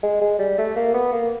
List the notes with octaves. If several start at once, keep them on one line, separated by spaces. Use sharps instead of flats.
G#3
G#3
G3
A3
A#3
B3
A#3